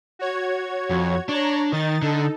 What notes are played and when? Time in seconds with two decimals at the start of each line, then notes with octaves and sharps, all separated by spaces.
0.19 F#4 C#5 G#6
0.90 F2
1.29 D4 C#5 A#5
1.72 D#3 D#4 A6
2.02 D3 D#4 A4